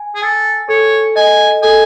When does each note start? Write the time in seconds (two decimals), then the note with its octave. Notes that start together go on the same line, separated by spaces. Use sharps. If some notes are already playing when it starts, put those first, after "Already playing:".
Already playing: G#5
0.15 G#4
0.22 A4 G#5
0.69 A4 C#5
1.16 D#5 G#5
1.63 A4 G#5